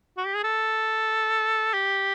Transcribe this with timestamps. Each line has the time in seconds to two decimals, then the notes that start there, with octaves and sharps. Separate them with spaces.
0.17 F#4
0.26 G4
0.35 G#4
0.44 A4
1.74 G4